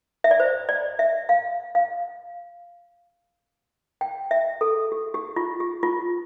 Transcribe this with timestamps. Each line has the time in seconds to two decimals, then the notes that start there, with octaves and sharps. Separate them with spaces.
0.24 E5
0.31 D5
0.40 C5
0.69 D5
0.99 E5
1.29 F5
1.75 F5
4.01 G5
4.31 E5
4.61 A4
4.92 G4
5.14 G4
5.36 F4
5.60 G4
5.83 F4